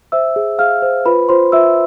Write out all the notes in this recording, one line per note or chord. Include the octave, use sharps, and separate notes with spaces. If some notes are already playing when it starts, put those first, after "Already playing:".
C5 E5 E6
G#4
G#4 F5 F6
C5
F4 B4 B5
F4 C5 C6
F4 E5 E6